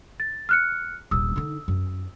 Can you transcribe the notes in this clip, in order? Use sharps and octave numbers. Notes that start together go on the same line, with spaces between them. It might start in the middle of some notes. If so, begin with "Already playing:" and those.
A6
F6 F#6 C#7
D#1 A#1 D#6 E6
D3 D#4
F#2